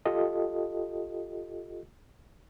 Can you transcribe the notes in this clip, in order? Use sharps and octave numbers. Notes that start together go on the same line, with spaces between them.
F4 G4 A4 D#5